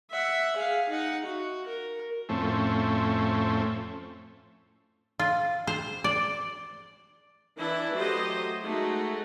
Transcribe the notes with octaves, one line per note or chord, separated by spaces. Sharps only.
E5 F#5
G#4 F5
D#4 F#5
F#4
A#4
F2 A2 A3 C4 C#4
F4
C5
D5
E3 D4 E4
F#3 A3 G4 C5 D#5
G#3 A3 D#4 F#4